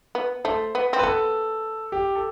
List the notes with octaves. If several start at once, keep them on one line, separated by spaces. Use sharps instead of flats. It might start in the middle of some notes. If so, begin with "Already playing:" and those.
B3
A3 C5
B3
C4
B4
B3 A4
G4
A4